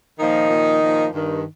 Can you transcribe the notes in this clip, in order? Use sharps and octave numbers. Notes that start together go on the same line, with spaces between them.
A#2 D#3 F3 D#4
A#2 F3
A#2 F3
G2 D#3